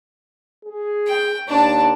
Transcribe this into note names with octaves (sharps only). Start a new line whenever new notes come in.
G#4
G5
D#2 D4 A5